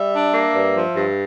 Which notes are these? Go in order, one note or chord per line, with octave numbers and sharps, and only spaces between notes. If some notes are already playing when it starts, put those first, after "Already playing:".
Already playing: G3 E5
D4
A#3
G2
F3
G2